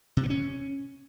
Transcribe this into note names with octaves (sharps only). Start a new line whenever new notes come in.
C3
B3
C#4